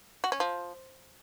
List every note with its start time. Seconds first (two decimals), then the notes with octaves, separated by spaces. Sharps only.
0.24 F#4
0.32 C#4
0.40 F3